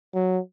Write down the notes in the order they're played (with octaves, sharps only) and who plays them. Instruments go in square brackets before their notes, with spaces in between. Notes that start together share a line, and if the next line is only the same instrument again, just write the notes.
[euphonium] F#3